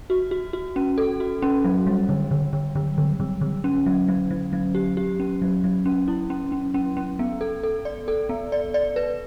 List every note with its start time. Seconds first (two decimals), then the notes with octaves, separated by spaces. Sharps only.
0.10 F#4
0.31 F#4
0.53 F#4
0.76 C#4
0.98 A4
1.20 F#4
1.42 C#4
1.64 F#3
1.87 G3
2.09 D3
2.31 D3
2.53 D3
2.76 D3
2.98 D3
3.20 D3
3.41 D3
3.64 C#4
3.86 F#3
4.08 F#3
4.31 F#3
4.53 F#3
4.75 G4
4.97 G4
5.20 C#4
5.42 F#3
5.64 F#3
5.86 C#4
6.08 E4
6.30 C#4
6.52 C#4
6.74 C#4
6.97 C#4
7.19 B3
7.41 A4
7.63 A4
7.85 D5
8.08 A4
8.29 B3
8.52 D5
8.74 D5
8.96 B4